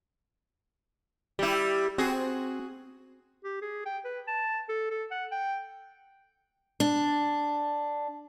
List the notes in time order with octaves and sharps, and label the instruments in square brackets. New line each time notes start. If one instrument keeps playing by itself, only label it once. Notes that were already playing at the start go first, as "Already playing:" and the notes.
[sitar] G3 E4 [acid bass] G4
[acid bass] C4 [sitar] F#4 G#4
[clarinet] G4
G#4
G5
B4
A5
A4
A4
F#5
G5
[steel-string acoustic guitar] D4